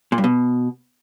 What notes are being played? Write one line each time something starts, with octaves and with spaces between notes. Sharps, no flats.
A#2
G2
B2